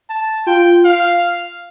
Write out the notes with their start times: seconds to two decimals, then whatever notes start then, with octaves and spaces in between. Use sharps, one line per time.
0.09 A5
0.47 F4 G5
0.85 F5